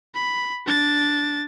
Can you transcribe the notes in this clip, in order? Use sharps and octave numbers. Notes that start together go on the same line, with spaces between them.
B5
D4 A6